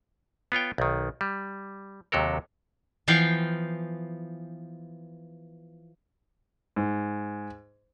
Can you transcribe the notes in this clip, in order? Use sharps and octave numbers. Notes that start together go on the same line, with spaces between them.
B3 F4 C#5 G5
B1 D#3
G3
D#2 C3 F#3 A4 A#4
E3 F3 B3 F5 G5
G#2